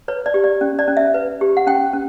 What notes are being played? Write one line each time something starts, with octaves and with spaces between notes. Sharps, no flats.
B4 C#5
D5
G4
D5
C#4
D5
C#4
E5
B4
G4
F#5
C#4 G5
C#4